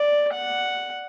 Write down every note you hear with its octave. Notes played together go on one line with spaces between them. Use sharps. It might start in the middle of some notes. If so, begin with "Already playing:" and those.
Already playing: D5
F#5